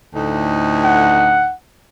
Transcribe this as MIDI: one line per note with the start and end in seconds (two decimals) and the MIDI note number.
0.15 1.52 38
0.15 1.52 45
0.15 1.52 63
0.84 1.54 78